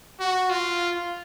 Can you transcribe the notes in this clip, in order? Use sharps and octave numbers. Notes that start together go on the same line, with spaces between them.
F#4
F4